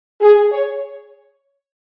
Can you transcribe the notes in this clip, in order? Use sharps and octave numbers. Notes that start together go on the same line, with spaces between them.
G#4
C#5